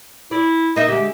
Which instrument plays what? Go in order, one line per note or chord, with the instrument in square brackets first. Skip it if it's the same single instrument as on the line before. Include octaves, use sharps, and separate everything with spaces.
[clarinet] E4 [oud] D5
[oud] A#3 D#4 E5 [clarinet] D#5
[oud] D3 G#3 [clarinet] G4